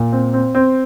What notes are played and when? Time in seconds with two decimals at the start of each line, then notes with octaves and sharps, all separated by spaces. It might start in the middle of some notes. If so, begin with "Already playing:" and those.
Already playing: A#2
0.12 C4
0.33 C4
0.55 C4